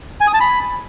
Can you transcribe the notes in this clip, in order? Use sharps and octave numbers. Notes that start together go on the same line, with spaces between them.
G#5
D#6
A5
B5